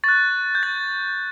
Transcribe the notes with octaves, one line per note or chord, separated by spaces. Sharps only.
C#6 F#6 A6
G6
A6